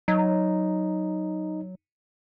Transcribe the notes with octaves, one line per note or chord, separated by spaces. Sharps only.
F#3 D#4